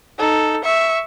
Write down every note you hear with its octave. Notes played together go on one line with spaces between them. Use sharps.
D#4 A4
E5 C#6